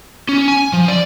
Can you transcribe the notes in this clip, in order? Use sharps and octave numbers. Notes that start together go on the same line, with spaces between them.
C#4
G#5
F3
D5